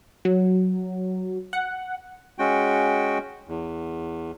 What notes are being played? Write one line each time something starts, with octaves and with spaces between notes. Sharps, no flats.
F#3
F#5
G#3 C#4 F#4 G5
E2